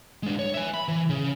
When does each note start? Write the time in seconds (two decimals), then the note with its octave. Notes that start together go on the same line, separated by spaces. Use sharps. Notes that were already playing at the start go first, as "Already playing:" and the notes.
0.23 G#3 D4
0.39 C#5
0.54 E5 G#5
0.74 B5
0.88 E3
1.10 C#3